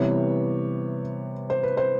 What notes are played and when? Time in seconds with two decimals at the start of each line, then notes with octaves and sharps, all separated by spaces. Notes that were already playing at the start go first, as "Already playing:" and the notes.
Already playing: C3 E3 G3 B3 C#5
1.50 C5
1.63 B4
1.77 C5